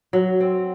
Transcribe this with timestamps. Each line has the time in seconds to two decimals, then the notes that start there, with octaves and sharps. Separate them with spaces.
0.13 F#3
0.40 C4